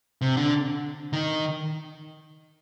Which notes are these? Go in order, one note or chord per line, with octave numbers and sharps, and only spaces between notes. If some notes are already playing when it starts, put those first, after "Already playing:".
C3
D3
D#3